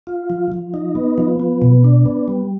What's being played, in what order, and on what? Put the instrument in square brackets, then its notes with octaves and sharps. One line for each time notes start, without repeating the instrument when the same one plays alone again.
[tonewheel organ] F4
F3
F3
D#4
B3
F3
B3
B2
D4
B3
G3